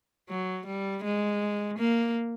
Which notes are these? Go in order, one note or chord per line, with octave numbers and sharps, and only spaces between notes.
F#3
G3
G#3
A#3